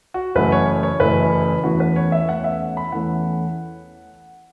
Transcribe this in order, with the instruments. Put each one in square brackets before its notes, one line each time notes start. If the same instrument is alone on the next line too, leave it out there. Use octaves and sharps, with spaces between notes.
[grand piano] F#4
F#1 F#2 E3 A3 B4
C#5
C#5
F#1 F#2 E3 A3 B4
E2 E3 A3 C#4 F#4
B4
C#5
E5
E2 E3 A3 C#4 F#5
E5
B5
E2 E3 A3 C#4 F#5